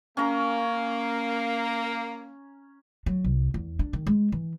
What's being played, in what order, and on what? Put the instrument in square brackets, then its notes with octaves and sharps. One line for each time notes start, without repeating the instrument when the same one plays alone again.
[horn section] A#3 [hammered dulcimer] C#4 A#5
[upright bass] F#3
C2
E2
D4
D#3
G#3
E3